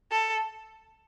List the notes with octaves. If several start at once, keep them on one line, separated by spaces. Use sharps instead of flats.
A4